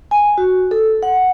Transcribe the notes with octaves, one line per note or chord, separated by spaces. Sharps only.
G#5
F#4
A4
F#5